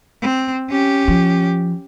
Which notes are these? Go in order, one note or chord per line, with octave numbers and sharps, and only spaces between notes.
C4
C#4 G4
F3